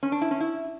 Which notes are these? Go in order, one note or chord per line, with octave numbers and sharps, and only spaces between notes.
C#4
D4
E4
C#4
E4